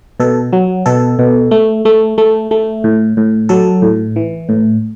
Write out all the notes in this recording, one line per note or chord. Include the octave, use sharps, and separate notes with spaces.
B2 A4
F#3
B2 A4
B2
A3
A3
A3
A3
A2
A2
F#3 A4
A2
E3
A2